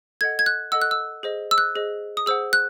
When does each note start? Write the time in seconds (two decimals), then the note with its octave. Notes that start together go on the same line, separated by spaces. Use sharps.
0.21 A4 D#5 F#5 G#6
0.39 G#6
0.46 F#6
0.72 A4 D#5 F#5 E6
0.82 F#6
0.91 E6
1.23 G#4 C5 D#5
1.51 E6
1.58 F#6
1.76 G#4 C5 D#5
2.17 D#6
2.26 G#4 C5 F#5 E6
2.53 F#6